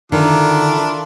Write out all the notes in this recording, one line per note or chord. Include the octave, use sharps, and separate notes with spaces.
D3 D#3 D4 E4 F4